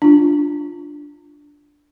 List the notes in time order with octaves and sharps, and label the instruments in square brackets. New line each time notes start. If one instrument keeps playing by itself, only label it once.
[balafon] D4 F4